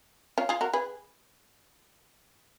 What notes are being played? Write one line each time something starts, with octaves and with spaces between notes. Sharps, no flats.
C#4 F4
F4 G#4
F#4 A#4
G#4 B4